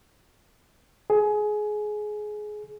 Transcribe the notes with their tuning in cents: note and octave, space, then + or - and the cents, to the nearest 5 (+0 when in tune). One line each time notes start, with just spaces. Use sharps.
G#4 +20